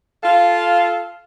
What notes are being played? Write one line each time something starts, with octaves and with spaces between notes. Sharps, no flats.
F4 A4 F5